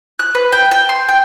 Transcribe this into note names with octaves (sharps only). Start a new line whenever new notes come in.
F#6
B4
G5
G5
C6
G5